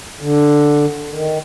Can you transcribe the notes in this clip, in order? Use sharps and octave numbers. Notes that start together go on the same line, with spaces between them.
D3
D#3